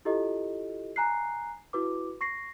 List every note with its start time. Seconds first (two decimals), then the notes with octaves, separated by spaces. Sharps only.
0.05 E4 F4 G4 A4 D#5
0.96 G#5 A#5 F#6 C7
1.73 E4 F#4 B4 D6
2.21 C#6 A#6 C7